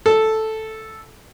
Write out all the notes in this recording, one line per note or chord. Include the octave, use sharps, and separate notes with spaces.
A4